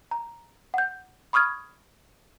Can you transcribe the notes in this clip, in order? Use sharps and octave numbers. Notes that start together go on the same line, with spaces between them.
A#5
F#5 G6
B5 C#6 D#6 F6 G#6